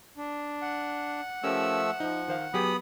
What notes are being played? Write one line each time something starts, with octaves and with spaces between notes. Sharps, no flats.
D4
F#5
F3 A3 C#4 G4 A#4 E6
F3 D#4
D#3 C5 F5
F#3 B3 G4 G#4 B5 D#6